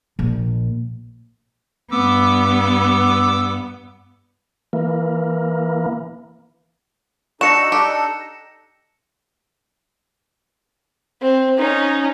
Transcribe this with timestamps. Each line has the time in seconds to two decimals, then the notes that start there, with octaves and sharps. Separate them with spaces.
0.19 A#1
1.91 G2 B3 D6 E6
4.73 E3 A#3
7.41 D4 D#4 F#4 A4 A#6 C#7 E7
7.72 G4
11.21 C4
11.58 C#4 D#4